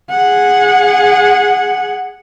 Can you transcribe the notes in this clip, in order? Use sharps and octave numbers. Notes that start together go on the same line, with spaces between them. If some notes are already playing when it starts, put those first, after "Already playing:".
G#4 F#5